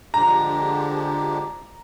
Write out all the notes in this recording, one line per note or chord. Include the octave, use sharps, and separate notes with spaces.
D3 F3 G#3 D4 G4 A#5